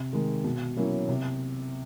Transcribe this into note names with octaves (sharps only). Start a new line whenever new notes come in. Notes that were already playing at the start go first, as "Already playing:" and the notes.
Already playing: C3
D#3 G#3
B2
F#3 A#3 C#4 E4
C3